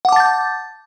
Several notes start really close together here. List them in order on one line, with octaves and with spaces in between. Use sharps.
F#5 D6 A5 A6 G6